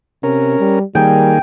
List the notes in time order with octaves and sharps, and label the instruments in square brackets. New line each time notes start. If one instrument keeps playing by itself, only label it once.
[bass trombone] C3 [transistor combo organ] C#4 A#4
[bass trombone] G3
[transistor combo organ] D#3 A#3 G#4 [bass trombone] G3 [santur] G5